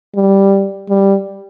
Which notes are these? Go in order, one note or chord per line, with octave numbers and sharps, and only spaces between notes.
G3
G3